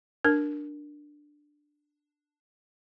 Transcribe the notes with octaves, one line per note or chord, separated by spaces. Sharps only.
D4 A#4